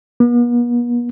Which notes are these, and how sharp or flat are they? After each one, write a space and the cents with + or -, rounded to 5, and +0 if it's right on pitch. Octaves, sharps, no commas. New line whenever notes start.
B3 -45